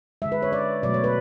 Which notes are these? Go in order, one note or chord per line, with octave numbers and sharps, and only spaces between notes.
D3 G#3 E5
B4
C#5
D5
B2 F#3 A3 D5
C#5
B4